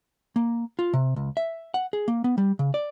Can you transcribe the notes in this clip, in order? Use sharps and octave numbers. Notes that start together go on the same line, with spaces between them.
A#3
F4
C3
C#2
E5
F#5
G#4
A#3
B3
G3
C#3
D5